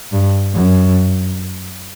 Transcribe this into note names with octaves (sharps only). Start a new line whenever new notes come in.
G2
F#2